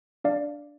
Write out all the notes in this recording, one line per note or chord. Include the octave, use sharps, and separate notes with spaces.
D4 D5 F5